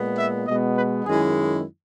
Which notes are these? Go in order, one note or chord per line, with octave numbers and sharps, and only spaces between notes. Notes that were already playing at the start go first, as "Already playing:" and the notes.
Already playing: A#2 G#3 B3
E5
B2 G#3 B3 D#5
B4
F#2 D#3 G#3 C#4 E4 G#4